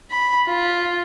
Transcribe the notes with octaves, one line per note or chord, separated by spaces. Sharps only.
B5
F4